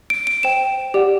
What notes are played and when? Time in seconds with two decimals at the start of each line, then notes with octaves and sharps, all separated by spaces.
0.10 D7
0.27 D7
0.43 C5 G5 E7
0.94 G4 D5 F#5